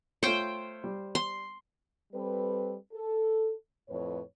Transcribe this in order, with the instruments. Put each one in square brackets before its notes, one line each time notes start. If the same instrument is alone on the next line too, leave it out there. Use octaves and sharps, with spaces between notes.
[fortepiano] A3 F4 C#5 [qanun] C5 G5
[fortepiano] G3
[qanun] C6
[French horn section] G3 C4 A4 B4
A4
F2 A2 B4 C#5